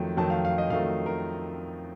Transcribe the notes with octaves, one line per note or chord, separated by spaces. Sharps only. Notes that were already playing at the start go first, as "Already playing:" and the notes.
Already playing: F2 D#3 F#3 A3
F2 D#3 F#3 A3 A5
F5
F5
D#5
F2 D#3 F#3 A3 F5
A#4